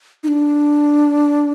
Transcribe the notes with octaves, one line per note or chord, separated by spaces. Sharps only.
D#4
D4